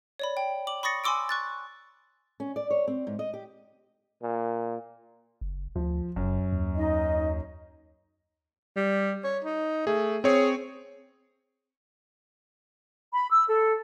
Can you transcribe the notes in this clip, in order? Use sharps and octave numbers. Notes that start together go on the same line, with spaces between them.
C#5 D5 B5
G5
D6 F#7
B5 C#6 D#6 A6 A#6 C#7
G#5 B5 C6 D6 E6 D7
C#6 F#6 A6
C#4
D5
C#5
C4
G#2
D#5
G4
A#2
F#1
D2 F3
F#1 F#2
D#2
D#4 D#5
G3
C#5
D#4
A3 G#4
C4 G#4 C#5
B5
E6
A4